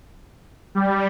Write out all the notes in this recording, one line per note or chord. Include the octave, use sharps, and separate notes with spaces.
G3